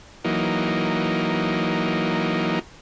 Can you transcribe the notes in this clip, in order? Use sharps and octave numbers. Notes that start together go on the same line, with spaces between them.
E3 F#3 A#3 D#4